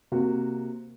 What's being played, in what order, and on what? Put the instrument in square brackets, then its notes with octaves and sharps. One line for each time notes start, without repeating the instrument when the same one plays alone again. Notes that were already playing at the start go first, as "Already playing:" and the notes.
[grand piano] C3 A#3 F#4